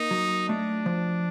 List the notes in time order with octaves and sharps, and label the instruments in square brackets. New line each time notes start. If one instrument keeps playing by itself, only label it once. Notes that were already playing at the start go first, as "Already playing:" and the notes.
Already playing: [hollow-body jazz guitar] A#3 [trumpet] D#4
[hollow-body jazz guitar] F#3
[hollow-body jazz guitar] A3 [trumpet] D4
[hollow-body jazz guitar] F3